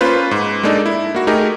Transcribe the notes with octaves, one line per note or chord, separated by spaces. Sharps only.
A#3 C#4 F4 B4 C5
G#2
G#3 A#3 D4 D#4 A4 D5
E4
A#3 F#4
A3 D#4 G4 G#4 A#4